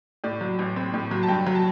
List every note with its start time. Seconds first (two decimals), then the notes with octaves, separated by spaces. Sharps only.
0.24 A2 D5
0.41 F#3
0.59 A1
0.76 C4
0.94 A2
1.11 F#3
1.23 A5
1.28 G2 G5
1.47 F#3
1.55 A5